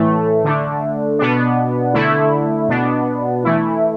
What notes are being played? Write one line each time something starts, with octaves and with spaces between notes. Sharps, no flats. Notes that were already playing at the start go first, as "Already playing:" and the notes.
Already playing: A2 E3 A3
D3 A3 D4
B2 B3 D4
D3 A3 E4
B2 B3 D4
E3 A3 E4